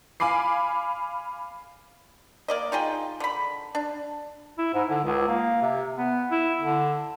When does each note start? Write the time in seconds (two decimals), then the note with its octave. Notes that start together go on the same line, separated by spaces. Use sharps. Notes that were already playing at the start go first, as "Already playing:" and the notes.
0.20 F5 G#5 B5 D6 C7
2.48 A#3 D5 D#5
2.72 D#4 F4 G#4 G5
3.20 D3 B5
3.75 D4
4.58 E4
4.74 G#2
4.90 D3
5.04 C#2
5.28 A#3
5.62 C3
5.96 B3
6.31 E4
6.61 D3